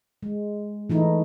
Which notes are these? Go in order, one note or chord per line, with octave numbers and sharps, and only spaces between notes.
G#3
E3 A3 D#4 E4